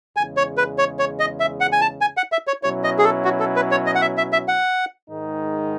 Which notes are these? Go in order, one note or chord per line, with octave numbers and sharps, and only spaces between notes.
E2 C#3 G#3 G#5
C#5
B4
C#5
C#5
D#5
E5
F#5
G#5
A5
G#5
F#5
E5
C#5
B2 F#3 C#4 E4 C#5
D#5
G#4
A4
F#4
A4
B4
C#5
D#5
F#5
E5
E5
E5
F#5
G#2 D#3 G#3 D#4